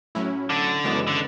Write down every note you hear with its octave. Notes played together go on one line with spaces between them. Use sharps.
A2 F#3 C#4 E4
D3
F#2 C#3 E3 G#3 B3
D3